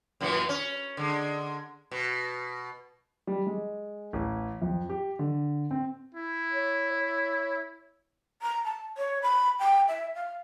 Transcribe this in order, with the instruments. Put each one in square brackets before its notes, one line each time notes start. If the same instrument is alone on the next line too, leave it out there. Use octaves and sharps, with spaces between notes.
[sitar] F#2 A#2 E3
C#4
D3 G#3
B2
[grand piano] G3
G#3
A1
F2
G4
D3
C4
[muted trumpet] E4
[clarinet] C#5
C#5
[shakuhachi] A#5
A5
C#5
B5
G5
E5
F5